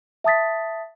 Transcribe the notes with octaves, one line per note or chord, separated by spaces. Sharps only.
E5 A5 D#6 A6 B6